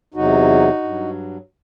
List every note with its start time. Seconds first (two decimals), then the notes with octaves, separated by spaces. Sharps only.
0.14 E2 C3 F#3 D#4 F#4
0.83 G2 F#3